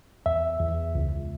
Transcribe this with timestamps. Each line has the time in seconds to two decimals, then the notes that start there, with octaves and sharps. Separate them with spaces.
0.26 E2 E5
0.60 E2
0.95 C#2